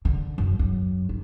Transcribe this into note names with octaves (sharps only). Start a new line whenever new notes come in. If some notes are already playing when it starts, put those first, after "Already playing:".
D3
F#2
F#2
D#3